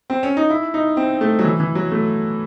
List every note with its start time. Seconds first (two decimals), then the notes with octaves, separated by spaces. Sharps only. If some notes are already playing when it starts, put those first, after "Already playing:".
0.10 C4
0.23 C#4
0.37 D#4
0.50 E4
0.74 D#4
0.97 C4
1.21 A3
1.39 F#3
1.44 E3
1.60 E3
1.75 F#3
1.92 A3